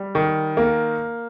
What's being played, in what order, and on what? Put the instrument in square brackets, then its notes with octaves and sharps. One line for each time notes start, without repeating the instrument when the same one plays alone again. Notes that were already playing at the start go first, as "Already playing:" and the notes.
Already playing: [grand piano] G3
D#3
A#3